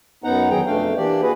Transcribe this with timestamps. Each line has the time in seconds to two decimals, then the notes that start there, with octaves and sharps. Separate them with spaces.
0.24 F#2 B3 D#4 F#5 A#5
0.50 E2 D#3 F#3 G#4 G5 A#5
0.66 F2 B2 A3 D4 F5 G5
0.97 E3 A#3 D4 G4 D5
1.22 F#4 G#4 B4